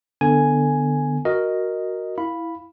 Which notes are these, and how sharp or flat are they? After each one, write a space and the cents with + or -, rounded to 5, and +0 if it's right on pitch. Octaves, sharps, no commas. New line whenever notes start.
D3 +20 B3 +15 G#5 +0
F#4 +0 A#4 +0 D#5 +0
E4 +0 F5 +0 B5 +0